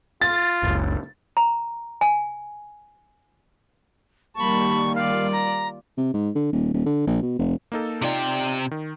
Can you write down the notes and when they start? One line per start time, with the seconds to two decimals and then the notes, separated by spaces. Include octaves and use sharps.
0.21 F4 A6
0.63 F#1 C#2
1.37 A#5
2.01 G#5
4.36 D#3 G3 A#3 A5 B5 C#6
4.96 F4 D5 F5
5.32 A#5
5.97 C3
6.14 G#2
6.35 D3
6.53 D#1
6.74 D#1
6.86 D3
7.07 A#1
7.22 B2
7.39 F1
7.72 A#3 D#4 A4
8.02 C3 D#4 F4 D5 G5
8.71 D#3